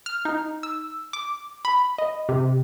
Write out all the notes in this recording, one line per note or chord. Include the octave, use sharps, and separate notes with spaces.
F6
D#4
E6
D6
B5
D#5
C3